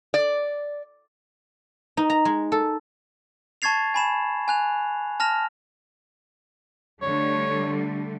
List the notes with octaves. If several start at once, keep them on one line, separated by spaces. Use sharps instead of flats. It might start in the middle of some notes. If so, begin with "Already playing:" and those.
D5
D#4
A#5
G#3
A4
A5 C#6 G#6 A6 C7 F7
G#5 B5 E7
G#5 F#6 F7
A5 F6 A#6 F7
D3 G3 A3 C#5